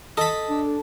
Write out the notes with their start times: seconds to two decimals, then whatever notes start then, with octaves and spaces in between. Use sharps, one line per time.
0.17 A4 D#5 B5
0.49 D4